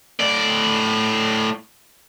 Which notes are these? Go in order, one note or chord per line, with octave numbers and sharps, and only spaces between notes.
A2 D5